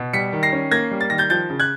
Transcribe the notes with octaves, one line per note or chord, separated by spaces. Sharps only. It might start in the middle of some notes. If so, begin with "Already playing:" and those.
Already playing: B2
G3 B6 C#7
D#3
A#6 C7
C#4
A#3 G#6 A#6
G3
A6
D#3 A#6
G6 A6
F3 G6 A6
C#3
F#6 G#6